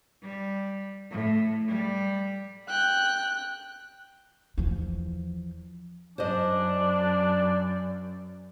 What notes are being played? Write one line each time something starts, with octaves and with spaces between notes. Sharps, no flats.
G3
A2
G3
G5 F#6
E2 F3
F#2 D4 C5 D#5
D5